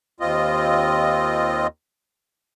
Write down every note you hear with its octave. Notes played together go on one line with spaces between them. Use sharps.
D#2 C4 F4 D#5